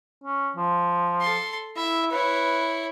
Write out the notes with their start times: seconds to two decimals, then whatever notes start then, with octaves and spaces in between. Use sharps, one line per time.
0.24 C#4
0.56 F3
1.21 A4 C6
1.77 E4 E5
2.11 E4 B4 C#5